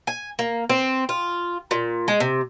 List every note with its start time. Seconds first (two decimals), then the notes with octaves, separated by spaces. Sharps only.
0.07 G#5
0.39 A#3
0.70 C4
1.09 F4
1.71 A#2
2.08 G#3
2.20 C3